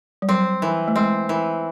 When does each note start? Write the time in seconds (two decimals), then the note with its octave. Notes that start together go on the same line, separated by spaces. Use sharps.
0.22 G3
0.29 F#3 C4
0.62 E3
0.88 A3
0.96 G#3 C4
1.29 E3